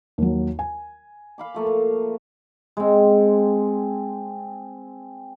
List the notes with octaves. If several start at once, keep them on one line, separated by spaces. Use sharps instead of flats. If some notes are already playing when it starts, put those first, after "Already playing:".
D#2 F#3
G#5
F5 B5 D6
F3 A3 A#3
G#3 C4